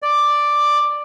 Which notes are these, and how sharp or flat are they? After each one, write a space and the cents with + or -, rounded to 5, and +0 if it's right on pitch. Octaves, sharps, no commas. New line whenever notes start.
D5 +5